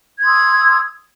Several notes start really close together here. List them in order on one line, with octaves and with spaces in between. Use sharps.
G#6 C6 D#6 E6